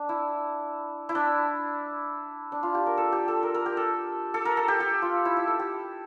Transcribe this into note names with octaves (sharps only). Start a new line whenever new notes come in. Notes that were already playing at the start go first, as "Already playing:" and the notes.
Already playing: D4
E4
E4
D4
D4
F4
G4
A#4
A4
G4
A4
A#4
A#4
G4
A4
A4
A#4
A4
G4
G4
F4
E4
E4
A4
G4